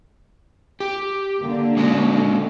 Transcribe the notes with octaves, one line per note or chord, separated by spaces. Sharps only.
G4
D3 A#3
G#3 C#4 F#4